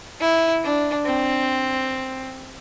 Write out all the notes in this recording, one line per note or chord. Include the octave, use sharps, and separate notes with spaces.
E4
D4
C4